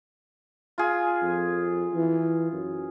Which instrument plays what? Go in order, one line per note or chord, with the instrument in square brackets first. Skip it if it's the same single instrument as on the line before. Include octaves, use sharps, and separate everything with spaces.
[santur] F4 G#4
[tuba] F2
E3
F#2